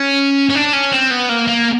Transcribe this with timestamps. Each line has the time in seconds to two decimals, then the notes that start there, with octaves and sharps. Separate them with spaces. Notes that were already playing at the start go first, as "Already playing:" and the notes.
Already playing: C#4
0.49 C#4
0.55 D4
0.73 C#4
0.92 C4
1.10 B3
1.29 A#3
1.48 A#3